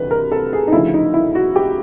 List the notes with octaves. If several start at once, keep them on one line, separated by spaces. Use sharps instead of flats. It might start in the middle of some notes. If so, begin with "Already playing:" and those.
Already playing: D2 C3 E3 B4
A#4
A4
G#4
D#4
D2 C#3 F3 E4
D#4
E4
F#4
G4